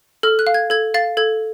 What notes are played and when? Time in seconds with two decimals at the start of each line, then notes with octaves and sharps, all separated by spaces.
0.23 A4 F6
0.39 F#6
0.47 F5
0.54 G#6
0.70 A4 G#6
0.94 F5 A6
1.17 A4 G#6